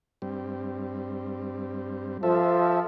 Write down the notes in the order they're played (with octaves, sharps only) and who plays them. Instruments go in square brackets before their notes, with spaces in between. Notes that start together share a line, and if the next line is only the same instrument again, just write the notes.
[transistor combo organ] G2 G3 C4
[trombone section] F3 [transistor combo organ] A4 E5